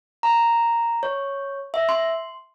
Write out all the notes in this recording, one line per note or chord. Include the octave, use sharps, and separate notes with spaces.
A#5
C#5
E5
C6